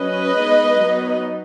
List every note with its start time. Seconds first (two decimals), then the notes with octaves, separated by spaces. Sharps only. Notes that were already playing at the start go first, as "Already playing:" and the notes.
Already playing: F#3 C#4 B4 D#5
0.36 G#3 B3 D#4
0.80 F#3 B3 D#4